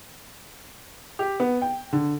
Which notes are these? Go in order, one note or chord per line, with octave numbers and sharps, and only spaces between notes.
G4
B3
G5
D3